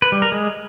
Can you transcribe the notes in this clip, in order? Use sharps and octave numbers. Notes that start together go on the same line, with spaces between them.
B4
G3
A#4
G#3